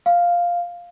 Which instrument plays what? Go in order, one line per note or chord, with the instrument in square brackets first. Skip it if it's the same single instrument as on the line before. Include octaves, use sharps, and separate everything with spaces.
[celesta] F5